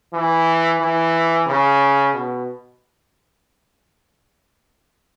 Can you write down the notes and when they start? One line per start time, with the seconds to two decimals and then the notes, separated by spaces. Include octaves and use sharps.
0.13 E3
0.80 E3
1.47 C#3
2.14 B2